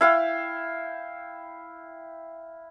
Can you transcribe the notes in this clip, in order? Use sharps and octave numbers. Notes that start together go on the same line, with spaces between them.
E4 F5 G5